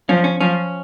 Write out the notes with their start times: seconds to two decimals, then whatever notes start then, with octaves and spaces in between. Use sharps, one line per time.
0.09 F3 C#4
0.24 C#4
0.41 F3 C#4